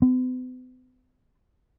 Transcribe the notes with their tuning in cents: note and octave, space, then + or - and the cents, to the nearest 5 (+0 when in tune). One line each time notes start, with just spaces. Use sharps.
B3 +45